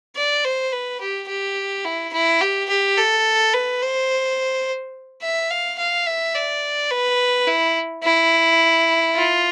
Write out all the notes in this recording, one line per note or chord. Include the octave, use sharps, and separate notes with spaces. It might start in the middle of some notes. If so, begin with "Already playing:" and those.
D5
C5
B4
G4
G4
E4
E4
G4
G4
A4
B4
C5
E5
F5
F5
E5
D5
B4
E4
E4
F4